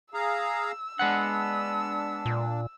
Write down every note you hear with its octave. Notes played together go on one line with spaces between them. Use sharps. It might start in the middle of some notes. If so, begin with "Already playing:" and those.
G#4 F5 A#5 E6
G#3 B3 D4 F#5
A#2